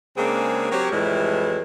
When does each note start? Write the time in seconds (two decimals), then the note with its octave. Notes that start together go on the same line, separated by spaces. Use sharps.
0.17 C#3 G#3 A#3 C4 D4 G#4
0.71 F#3 C4 G4 A#4 C#5
0.91 F2 A2 E3 G3 G#3 E4